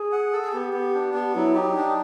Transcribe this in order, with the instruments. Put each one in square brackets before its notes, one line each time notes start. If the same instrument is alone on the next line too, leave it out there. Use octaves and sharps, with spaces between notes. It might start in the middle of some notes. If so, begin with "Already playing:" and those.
Already playing: [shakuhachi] G#4
[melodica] F#5
A4
[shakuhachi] G#4
[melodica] B3 [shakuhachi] G4
[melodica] B3
D4
B3
[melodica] F#3 [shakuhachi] E4
[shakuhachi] D#4 [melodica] G4
[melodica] D4 [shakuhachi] D#4